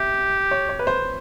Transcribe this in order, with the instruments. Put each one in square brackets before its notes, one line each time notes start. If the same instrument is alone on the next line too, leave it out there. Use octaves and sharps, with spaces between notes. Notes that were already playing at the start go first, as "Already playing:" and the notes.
Already playing: [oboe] G4 [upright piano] E5
[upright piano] C#5
C#5
B4
C5